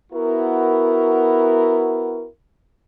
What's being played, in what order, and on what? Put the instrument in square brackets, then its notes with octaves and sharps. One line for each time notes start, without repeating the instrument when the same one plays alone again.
[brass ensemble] B3 E4 F#4 A#4